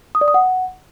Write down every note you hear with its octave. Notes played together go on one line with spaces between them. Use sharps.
D#6
D5
D#6
F#5